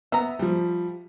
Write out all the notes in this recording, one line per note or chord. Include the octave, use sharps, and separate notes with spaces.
B3 E5 A#5
F3 G3